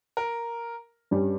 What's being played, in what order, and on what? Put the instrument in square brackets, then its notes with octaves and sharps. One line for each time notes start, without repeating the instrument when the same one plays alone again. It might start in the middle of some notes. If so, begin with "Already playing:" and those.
[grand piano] A#4
[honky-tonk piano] G2 G3 C#4